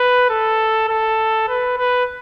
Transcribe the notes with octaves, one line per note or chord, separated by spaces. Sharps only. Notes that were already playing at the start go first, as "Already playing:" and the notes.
Already playing: B4
A4
A4
B4
B4